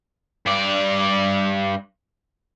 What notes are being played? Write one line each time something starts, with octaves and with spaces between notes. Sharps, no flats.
G2 D5